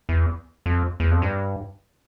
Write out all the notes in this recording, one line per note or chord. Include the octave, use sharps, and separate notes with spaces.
E2
F2
E2
F2
G2